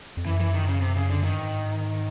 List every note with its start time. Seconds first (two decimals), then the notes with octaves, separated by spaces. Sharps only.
0.17 F2
0.26 F#2 E3
0.40 E3
0.54 D#3
0.68 C#3
0.82 C3
0.96 C#3
1.10 D3
1.24 G2 D#3
1.38 G#2